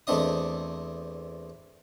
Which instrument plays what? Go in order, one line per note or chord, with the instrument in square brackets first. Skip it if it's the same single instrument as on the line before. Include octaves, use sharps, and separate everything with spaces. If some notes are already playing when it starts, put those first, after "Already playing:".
[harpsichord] E2 A3 C4 D4 D#5 D#6